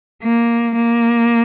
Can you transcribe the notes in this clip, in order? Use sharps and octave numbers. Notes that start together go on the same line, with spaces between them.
A#3
A#3